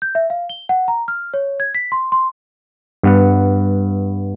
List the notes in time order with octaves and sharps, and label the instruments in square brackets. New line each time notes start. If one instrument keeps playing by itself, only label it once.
[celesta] G6
E5
F5
G7
F#5
A#5
F6
C#5
G#6
B6
C6
C6
[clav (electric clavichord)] G2 B3 F#5